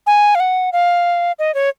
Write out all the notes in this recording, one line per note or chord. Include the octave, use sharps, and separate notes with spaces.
G#5
F5
F#5
F5
D#5
C#5